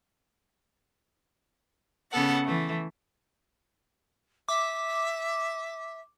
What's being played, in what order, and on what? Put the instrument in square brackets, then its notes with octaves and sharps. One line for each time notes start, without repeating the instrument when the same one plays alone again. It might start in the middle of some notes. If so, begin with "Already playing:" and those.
[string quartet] C#3 B3 A4 F#5
E3 A3
[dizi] E5 [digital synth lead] D6